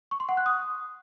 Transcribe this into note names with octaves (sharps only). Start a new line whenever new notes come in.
C#6
C6
F#5
F#6
D#6